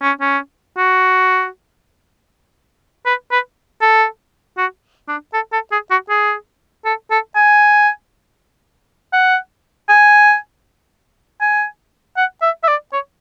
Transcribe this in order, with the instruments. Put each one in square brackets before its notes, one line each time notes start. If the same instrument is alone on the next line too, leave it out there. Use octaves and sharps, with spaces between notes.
[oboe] C#4
C#4
F#4
B4
B4
A4
F#4
D4
A4
A4
G#4
F#4
G#4
A4
A4
G#5
F#5
G#5
G#5
F#5
E5
E5
D5
C#5